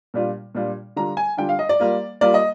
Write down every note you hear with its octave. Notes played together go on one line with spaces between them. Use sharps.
A#2 G3 D4 F4
A#2 G3 D4 F4
D3 G3 D4 F4 A#5
G#5
D3 G3 D4 F4 G5
F5
D#5
D5
G3 A#3 F4
G3 A#3 F4 D5
D#5